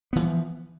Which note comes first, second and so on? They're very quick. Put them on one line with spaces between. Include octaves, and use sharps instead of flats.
B3 D3 E3 F3